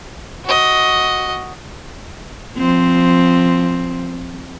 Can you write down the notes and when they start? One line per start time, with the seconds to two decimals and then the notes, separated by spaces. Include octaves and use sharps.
0.45 F#4 D#5
2.57 F3 C4